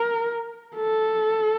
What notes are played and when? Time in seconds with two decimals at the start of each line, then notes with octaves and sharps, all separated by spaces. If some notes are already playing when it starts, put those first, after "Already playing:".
Already playing: A#4
0.77 A4